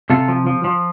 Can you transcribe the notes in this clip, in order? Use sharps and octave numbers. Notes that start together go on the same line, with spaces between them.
C3 F4 A4
F3
F3
F3